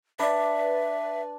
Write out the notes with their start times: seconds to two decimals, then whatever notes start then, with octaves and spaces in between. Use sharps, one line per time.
0.19 D4 B4 D5 E5